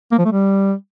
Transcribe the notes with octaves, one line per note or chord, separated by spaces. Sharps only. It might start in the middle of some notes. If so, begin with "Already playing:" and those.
A#3
F3
A3
G3